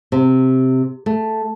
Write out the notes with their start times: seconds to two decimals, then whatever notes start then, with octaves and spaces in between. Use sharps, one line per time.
0.12 C3
1.06 A3